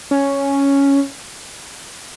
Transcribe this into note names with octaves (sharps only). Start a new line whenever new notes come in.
C#4